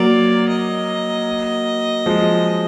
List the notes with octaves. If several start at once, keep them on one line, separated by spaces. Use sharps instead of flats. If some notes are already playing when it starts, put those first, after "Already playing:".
Already playing: F#3 A#3 D5
D#5
F3 G#3